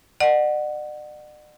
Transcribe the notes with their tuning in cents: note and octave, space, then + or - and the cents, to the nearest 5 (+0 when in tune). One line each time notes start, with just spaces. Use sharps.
D5 +45 F#5 +0